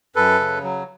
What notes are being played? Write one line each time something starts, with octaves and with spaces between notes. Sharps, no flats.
F#2 A4 B4
C#3
F#3